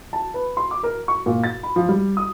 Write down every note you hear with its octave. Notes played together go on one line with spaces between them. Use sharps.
A5
B4
C6
D6
A#4
C#6
A#2
A6
B5
F3
G3
D#6